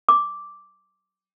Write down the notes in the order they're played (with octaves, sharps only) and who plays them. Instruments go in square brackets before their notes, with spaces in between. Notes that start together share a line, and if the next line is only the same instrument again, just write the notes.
[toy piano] D6